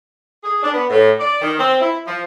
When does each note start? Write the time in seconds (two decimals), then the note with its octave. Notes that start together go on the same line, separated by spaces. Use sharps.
0.44 G#4
0.63 D4
0.74 B3
0.90 A2
1.19 D5
1.41 D#3
1.59 C4
1.80 E4
2.06 F3